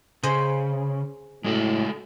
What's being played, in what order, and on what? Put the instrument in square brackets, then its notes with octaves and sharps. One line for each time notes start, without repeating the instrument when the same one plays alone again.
[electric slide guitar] C#3 [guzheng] G#4 C5 D#5
[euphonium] A2 [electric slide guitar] G#3 F#4 A4